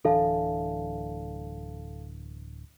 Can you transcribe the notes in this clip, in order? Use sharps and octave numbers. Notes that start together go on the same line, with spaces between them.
D1 E3 D4 A4 F5 A5